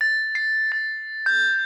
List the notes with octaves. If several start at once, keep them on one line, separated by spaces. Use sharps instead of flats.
A6
C7
A6
G6